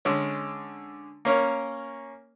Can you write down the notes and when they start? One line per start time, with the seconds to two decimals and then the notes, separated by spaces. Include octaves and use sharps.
0.05 D3 G#3 C#4
1.25 A#3 C#4 A#4 C#5